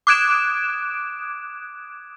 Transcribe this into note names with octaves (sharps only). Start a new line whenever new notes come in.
D6 D#6 F#6 G#6 D7 E7